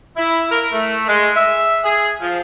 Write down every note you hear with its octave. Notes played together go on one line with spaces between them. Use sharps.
E4
A#4
A3
G#3
E5
G#4
F3